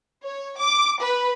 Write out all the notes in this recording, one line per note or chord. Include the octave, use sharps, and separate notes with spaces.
C#5
D6
B4